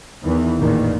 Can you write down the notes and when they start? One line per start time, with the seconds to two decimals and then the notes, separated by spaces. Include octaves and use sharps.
0.23 E2 D#3 E3
0.58 A1 E2 A#2 D3 D#3